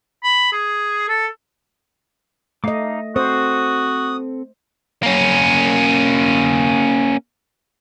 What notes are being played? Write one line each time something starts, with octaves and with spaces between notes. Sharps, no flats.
B5
G#4
A4
A3 D#4 D#5 F5 D6
C4 F#4 A4 C5 D#6
A#3 C#4